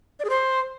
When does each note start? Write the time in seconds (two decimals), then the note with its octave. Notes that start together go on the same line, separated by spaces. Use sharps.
0.20 D5
0.25 G#4
0.30 C5